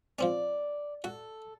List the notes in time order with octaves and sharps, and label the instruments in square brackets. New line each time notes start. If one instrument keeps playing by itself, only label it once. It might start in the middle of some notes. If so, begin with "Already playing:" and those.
[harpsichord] F3 C4 C#4 [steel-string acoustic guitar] D5
[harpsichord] F#4 [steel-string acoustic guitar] A4